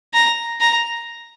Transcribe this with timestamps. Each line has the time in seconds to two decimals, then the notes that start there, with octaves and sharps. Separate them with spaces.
0.14 A#5
0.60 A#5